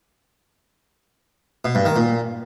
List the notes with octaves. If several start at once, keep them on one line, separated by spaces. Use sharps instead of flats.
B2
G2
D#3
A#2